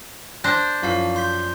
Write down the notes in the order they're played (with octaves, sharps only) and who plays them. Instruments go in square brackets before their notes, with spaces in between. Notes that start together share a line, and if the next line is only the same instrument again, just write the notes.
[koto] D4 C5 [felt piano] A#6
[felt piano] F#2 F3 C7 [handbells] E4 F#4 F5
[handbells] C6 G6 B6